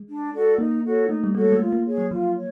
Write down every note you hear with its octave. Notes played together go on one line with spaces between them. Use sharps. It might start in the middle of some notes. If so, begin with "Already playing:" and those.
Already playing: G#3
D4
F#4 A4 D5
A#3 D#4
F#4 A4 C#5
A3 D#4
G3
G#3 F#4 A4 C#5
G#3
A3 F4
A#3
G#4 C#5
F#3
F3 F4
C#5